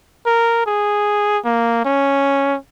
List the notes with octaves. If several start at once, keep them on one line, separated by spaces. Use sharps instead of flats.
A#4
G#4
A#3
C#4